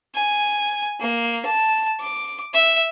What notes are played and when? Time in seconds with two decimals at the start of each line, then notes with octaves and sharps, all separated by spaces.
0.15 G#5
1.01 A#3
1.46 A5
2.00 D6
2.54 E5